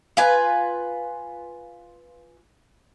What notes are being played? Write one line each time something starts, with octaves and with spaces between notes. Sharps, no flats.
F4 B4 G#5